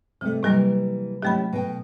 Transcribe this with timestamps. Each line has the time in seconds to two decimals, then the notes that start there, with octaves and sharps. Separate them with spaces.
0.21 C3 F3 A3
0.43 C3 E3 F#3 G3 A#3 A#4
1.23 F#3 A3 C#4 E4 G4 B5
1.53 B2 G5